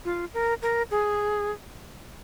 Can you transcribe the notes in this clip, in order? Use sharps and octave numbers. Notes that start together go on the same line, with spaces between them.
F4
A#4
A#4
G#4